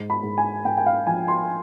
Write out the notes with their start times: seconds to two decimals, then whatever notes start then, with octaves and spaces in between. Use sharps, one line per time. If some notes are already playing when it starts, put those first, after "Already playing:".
Already playing: G#2
0.10 B5
0.23 G#2
0.38 G#5
0.65 G#2 G5
0.77 G5
0.86 F5
1.07 F3 G#5
1.28 C6